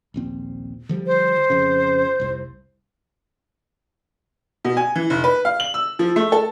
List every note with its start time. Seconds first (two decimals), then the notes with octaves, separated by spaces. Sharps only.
0.14 D#1 A#1 C4
0.89 D3 F3 G3
1.06 C5
1.50 F2 C#3
2.20 F1 C2
4.65 B2
4.77 G#5
4.95 E3
5.10 F1
5.24 B4
5.45 F5
5.60 F#7
5.74 E6
5.99 F3
6.16 A3
6.32 A4